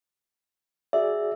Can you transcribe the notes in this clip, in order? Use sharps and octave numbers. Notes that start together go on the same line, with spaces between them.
F#4 G#4 D5 E5